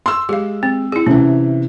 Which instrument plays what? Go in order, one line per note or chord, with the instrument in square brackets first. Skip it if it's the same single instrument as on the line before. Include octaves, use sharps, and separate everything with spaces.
[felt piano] C6 E6
[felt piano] G#3 [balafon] G4 F5
[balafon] C4
E4 G#4
[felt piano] C3 E3 [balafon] C#4